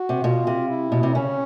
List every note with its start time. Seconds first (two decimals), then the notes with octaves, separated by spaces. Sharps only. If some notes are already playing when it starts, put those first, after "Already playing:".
Already playing: F#4
0.09 C3
0.24 B2 F4
0.47 C3
0.70 E4
0.92 B2
1.03 C3
1.15 C#3 C#4